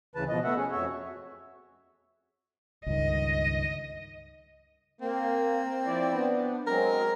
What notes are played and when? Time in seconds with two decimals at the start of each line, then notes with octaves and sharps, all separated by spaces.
0.15 D2 C#3 E3 B4 A5
0.29 B2 F3 D#5
0.44 A3 B3 E5 F#5
0.56 C#4 G#4
0.72 F2 F#4 C#5 E5
2.86 C#2 G2 D#3 D#5
5.01 A#3 C4
5.86 F3 E4 D5
6.11 B3 D4
6.67 F#3 G#3 C4 A#4